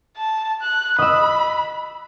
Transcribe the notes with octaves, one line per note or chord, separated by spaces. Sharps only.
A5
F#6
D#5 B5 E6